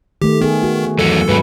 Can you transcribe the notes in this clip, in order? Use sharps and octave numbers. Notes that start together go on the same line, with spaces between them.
D#3 A3 G4
D#3 B3 G#4
F#4
E2 F#3 A4
G#2 F#3 B4